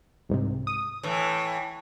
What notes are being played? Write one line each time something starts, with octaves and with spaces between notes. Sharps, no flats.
C2 G#2 C3
D#6
A2 E3